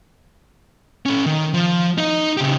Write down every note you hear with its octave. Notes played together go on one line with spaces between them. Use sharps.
C#4 A4
D#3
F3
D#4 D#5
C#3 G4